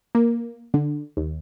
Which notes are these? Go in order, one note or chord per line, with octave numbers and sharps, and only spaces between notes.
A#3
D3
D#2